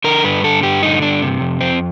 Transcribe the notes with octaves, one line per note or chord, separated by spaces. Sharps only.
D3 A#4
G2 B4
D3 A4
G2 G4
D3 D#4
G2 D4
C3
F2
F2 C4